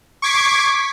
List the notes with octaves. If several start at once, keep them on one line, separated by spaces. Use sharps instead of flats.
C#6 D6 G#6 B6 C7 D7